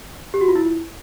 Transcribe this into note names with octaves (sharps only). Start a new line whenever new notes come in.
G4
F#4
F4
E4